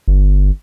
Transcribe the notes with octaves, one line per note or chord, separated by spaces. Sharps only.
G1